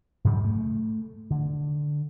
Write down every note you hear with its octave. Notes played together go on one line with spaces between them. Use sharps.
G#2 C#3 F#3 G3
A3
D3